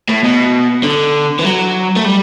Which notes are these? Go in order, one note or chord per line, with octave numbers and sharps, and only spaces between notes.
A2
B2
D3
E3
F#3
A3
G3